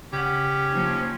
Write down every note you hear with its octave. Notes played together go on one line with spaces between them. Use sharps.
C#3 C#4 G4 F#5
F3 A#3 D#4